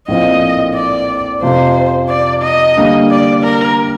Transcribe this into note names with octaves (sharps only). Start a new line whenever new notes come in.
A#1 A2 F3 C4 F4 D#5
D5
F2 C3 F3 C5
D5
D#5
D3 G3 A#3 D4
D5
A#4